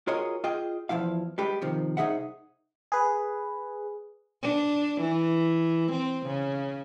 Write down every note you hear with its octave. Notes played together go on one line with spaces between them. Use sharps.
F4 F#4 G#4 A#4 C#5 D#5
F4 G#4 D#5 G5
E2 E3 F3 E4 F5
G3 G#3 G4 B4
C3 D#3 F3
C2 D#4 G#4 E5 F#5
G#4 B4
D4
E3
C4
C#3